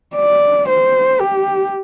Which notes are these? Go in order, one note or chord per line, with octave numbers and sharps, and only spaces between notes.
D5
C5
G4